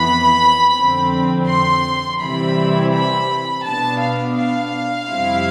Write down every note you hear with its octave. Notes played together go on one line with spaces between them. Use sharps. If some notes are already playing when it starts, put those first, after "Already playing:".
Already playing: F2 E3 B3 B5
F2 D3 F3 C4
C6
C3 E3 G3 C4 E4 B5
B5
B2 B3 D4 A5
F5
F5
F2 C3 G3 C4 E4